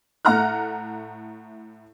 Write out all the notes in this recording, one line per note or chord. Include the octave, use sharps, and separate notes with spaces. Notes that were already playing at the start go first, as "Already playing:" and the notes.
A2 A3 F#5 A#5 F6 F#6